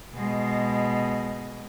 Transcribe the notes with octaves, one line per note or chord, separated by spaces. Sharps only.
B2 G#3